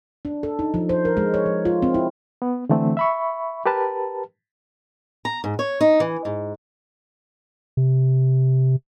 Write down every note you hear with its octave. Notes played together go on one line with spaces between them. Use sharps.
D4
A4
D#4
F3
C5
A#4
G#3
C#5
F3
F4
C4
E4
B3
D3 E3 A3 C4
E5 B5 C#6
G4 A#4 B4 A5
A#5
G#2
C#5
D#4
E3
G#2
C3